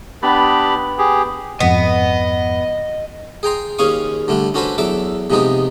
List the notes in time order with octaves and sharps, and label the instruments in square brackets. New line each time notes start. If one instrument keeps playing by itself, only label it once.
[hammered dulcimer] B3 [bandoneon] D4 G4 B5
[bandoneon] G4 G#4
[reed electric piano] F2 G#2 [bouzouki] B3 [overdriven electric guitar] D#5
[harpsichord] G#4 G5 A#5 C6
D#2 C#4 G#4 F5 C#6 D#6
D3 G3 A3 D4
C#4 D4 F#4 A4 B4 C5
E2 F#3 A4 E5 D6
C3 F3 G#3 B3 D#4 G4